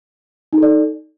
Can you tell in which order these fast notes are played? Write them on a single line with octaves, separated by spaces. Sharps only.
D#4 A4 D5